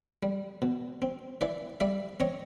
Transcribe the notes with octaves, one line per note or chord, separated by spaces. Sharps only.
G3
B2
C4
E3 D5 E5
G3 D5 E5
C4 C#5 D#5